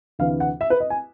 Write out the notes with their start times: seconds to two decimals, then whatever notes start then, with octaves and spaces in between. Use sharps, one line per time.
0.19 D2 C3 E3 F5
0.40 F#5
0.61 E5
0.70 B4
0.80 D#5
0.90 G#5